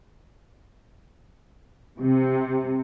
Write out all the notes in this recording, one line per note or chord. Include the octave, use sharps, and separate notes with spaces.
C3